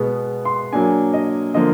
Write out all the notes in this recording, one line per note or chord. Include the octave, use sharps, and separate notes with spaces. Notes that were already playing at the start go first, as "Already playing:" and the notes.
Already playing: B2 G#3 B3
C6
F#3 A#3 D4 G#5
D#5
D3 F3 A#3 D#5